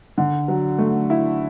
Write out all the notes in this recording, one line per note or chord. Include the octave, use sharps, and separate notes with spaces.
D3
F#3
A3
E4